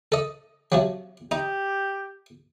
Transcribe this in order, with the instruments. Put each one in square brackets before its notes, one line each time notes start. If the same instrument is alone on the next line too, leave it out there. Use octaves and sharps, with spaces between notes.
[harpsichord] A4 D#5
C3 F3 F#3
[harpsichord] D#4 A#5 [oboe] G4